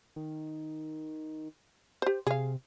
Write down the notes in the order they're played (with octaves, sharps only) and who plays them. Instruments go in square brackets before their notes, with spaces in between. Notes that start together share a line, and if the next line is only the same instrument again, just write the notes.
[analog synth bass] D#3
[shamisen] G4 C5
[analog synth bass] C3 [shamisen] G#4 F5